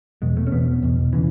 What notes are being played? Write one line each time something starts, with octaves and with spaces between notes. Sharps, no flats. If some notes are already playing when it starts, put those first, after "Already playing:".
E2 B2 G#3
A3
C#4
E2 B2 B3
E2 B2
C#3 E3